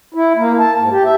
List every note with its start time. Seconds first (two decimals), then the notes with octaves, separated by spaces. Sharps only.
0.14 E4
0.36 A#3
0.59 A5
0.77 G#2
0.91 G4
1.04 E5